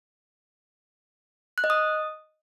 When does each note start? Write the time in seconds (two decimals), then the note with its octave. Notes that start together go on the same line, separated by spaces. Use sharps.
1.58 F#6
1.64 D#5
1.70 D#6